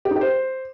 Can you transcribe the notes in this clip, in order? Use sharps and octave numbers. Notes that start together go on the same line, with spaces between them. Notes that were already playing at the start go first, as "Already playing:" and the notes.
G4
D#4
G4
C5